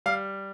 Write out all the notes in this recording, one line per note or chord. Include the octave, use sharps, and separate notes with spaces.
G3 F5